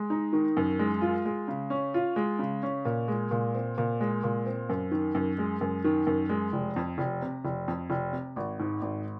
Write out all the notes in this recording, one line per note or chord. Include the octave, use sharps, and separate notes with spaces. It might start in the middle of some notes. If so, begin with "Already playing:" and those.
Already playing: G#3
D#4
D#3
F#2
G#3
F4
G#3
C#3
C#4
F4
G#3
C#3
C#4
A#2
G#3
A#2
C4
A#2
G#3
A#2
C4
F#2
D#3
F#2
G#3
F#2
D#3
F#2
G#3
F1
F2
F1
C3
F1
F2
F1
C3
G#1
G#2
G#1